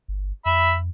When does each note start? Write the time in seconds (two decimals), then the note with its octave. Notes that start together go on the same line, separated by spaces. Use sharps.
0.08 G1
0.46 F2 E5 B5